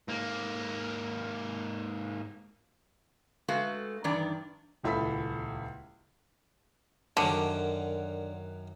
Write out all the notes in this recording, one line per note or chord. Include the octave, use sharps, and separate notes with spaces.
G#2 A#3
G#3 A3 F#4 A4 B4 F5
G2 D#3 E3 D4 D5 A#5
D#1 C#2 E4 A4 B5 B6
F#2 D3 D#3 F#3